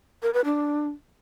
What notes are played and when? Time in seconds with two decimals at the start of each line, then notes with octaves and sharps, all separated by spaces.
0.23 A#4
0.34 B4
0.45 D4